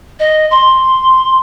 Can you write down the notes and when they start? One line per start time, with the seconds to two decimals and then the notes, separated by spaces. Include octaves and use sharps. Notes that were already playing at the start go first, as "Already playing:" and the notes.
0.19 D#5
0.51 C6